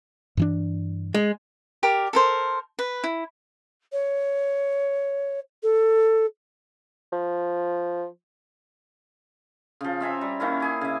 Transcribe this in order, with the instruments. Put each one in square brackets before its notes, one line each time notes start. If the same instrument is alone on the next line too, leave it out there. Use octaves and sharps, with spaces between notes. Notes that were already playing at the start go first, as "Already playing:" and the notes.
[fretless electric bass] G2 E3 D4
[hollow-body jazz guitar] G#3
[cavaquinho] G4 A#4 D5
A4 A#4 C5
B4
E4
[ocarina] C#5
A4
[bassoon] F3
[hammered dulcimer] C#3 F3
C4 E5 G#5 A#5
G3
D#3 A#3 C#4 E4
G#4 G#5 D6
C#3 E5